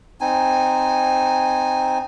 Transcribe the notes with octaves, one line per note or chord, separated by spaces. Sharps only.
C4 D#4 G#5